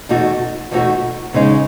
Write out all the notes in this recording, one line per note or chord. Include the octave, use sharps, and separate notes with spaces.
E2 B2 A3 D#4 F#4
E2 B2 A3 D#4 F#4
E2 C#3 G#3 D#4